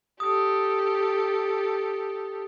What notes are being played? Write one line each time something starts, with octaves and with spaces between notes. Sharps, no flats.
G4 A4 D#6